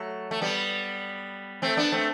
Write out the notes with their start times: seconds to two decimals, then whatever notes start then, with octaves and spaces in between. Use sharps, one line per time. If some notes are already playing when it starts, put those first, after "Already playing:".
Already playing: F#3 A3
0.31 A3
0.42 G3 B3
1.62 A3 C4
1.77 B3 D4
1.92 A3 C4